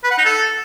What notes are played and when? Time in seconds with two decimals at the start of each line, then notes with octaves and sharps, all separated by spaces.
0.04 B4
0.11 F#5
0.18 D#4
0.25 A4